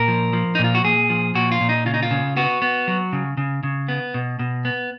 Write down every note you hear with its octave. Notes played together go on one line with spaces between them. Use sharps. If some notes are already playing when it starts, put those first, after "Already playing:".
Already playing: A#2 A#4
F3
F3
D#4
A#2
F4
F#4
A#2 G#4
F3
A#2 F#4
F4
A#2
D#4
C#3 F4
D#4
F4
C#3
B3 F#4
B3
F#3
C#3
C#3
C#3
B3
B2
B2
B3